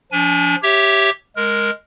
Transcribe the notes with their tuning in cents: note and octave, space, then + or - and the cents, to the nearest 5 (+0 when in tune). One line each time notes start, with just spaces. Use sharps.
F3 +0 D4 -35 G#5 +0
G4 +0 C#5 +0 E5 +0
G#3 +0 A#4 +0